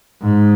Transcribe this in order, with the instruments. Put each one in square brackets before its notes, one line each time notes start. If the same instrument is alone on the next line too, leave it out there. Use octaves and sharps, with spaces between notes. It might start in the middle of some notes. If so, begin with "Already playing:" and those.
[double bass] G#2